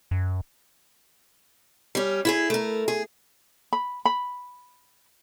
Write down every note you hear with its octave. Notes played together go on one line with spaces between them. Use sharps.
F#2
G3 C#4
E4 F4 G#4
A3 A#4
G#4
B5
B5